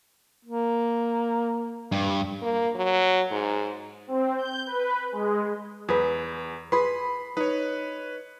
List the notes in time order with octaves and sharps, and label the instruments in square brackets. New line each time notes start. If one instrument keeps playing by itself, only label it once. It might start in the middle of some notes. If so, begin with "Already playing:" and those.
[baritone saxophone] A#3
[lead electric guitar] G2
[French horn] A#3
F#3
G#2
[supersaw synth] C4
G6
B4
G#3
[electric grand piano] E2 [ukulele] G#4 B4
[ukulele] G#4 B4 [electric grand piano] B5 C6
[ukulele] D#4 [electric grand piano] B4 C#5